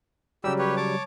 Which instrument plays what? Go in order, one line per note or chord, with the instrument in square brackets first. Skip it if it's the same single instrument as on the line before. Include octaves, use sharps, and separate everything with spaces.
[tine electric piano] C#3 F#3 G3 [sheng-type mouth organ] G4 E6
[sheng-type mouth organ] G4 B4 C#5
C#5 A5 D6